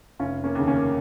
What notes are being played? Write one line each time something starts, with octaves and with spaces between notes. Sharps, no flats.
F1 C#4 F4
A#3 C#4
D#2 C#3
A#3 C#4